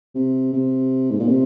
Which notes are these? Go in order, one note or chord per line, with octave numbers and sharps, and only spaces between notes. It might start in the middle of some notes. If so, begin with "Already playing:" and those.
C3
C3
G#2
A#2
C3